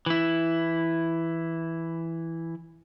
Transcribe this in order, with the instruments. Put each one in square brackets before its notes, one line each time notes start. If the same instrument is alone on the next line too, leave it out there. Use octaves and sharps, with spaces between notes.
[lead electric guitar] E3 E4